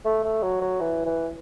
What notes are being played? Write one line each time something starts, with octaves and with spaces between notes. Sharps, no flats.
A3
A3
F#3
F#3
E3
E3